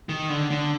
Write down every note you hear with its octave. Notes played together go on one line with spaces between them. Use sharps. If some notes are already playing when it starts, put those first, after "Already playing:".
D#3
D3
D3